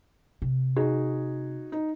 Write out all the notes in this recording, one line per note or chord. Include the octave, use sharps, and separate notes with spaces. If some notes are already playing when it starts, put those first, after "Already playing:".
C3
D#4 F#4 G#4
D#4